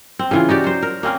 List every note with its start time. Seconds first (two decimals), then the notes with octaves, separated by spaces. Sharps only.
0.19 C4
0.31 C#3 E3 F4
0.49 D#4 F#4 G4 D5
0.64 F#3 C5
0.83 A#4
1.03 A#3 C4 C#4 A#4